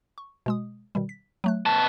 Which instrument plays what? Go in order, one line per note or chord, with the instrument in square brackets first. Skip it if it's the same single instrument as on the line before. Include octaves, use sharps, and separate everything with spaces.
[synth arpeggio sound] C#6
B2 G#3 D#6
B2 D#3 G3
B6
F#3 A3 F#6
[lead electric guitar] B3 A5